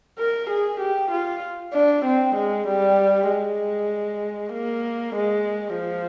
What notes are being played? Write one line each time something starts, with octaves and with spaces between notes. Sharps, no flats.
A#4
G#4
G4
F4
D4
C4
G#3
G3
G#3
A#3
G#3
F3